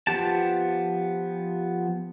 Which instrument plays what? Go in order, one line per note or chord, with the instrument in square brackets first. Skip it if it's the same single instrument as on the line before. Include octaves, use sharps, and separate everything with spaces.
[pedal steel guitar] F3 B3 G4 A5